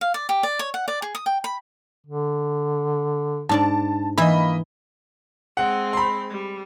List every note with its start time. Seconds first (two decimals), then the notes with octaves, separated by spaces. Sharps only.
0.01 F5
0.14 D5
0.29 G4
0.43 D5
0.59 C#5
0.74 F#5
0.88 D5
1.02 G#4
1.15 D#6
1.26 G5
1.44 B5
2.07 D3
3.49 G#2 D4 D5 A5
4.18 E3 A#3 E4 D#5 E5 B5
5.57 G#3 C4 F#5
5.93 B5 C6
6.30 G3